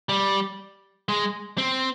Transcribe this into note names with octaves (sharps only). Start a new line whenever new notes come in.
G3
G#3
C4